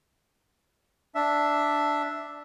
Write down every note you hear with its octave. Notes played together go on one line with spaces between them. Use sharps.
D4 E5